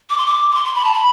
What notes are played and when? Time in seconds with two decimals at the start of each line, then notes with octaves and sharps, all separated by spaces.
0.10 D6
0.18 C6
0.26 D6
0.51 D6
0.55 C6
0.65 C6
0.75 B5
0.85 A5
0.94 B5